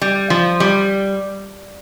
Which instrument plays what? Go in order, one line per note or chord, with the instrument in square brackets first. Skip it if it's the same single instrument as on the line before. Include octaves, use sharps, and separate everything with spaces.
[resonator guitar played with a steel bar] G3
F3
G3